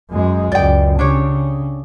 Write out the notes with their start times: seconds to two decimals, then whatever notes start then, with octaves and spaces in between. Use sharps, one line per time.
0.10 F#2 G#3
0.52 C#2 F#2 D5 G5
0.99 C#3 D4 G4 C#5